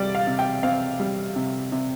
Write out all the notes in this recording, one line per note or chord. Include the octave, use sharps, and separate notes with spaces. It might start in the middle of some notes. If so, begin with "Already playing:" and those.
Already playing: C3 G3 D5
F5
C3
G5
C4 F5
G3
C3
C3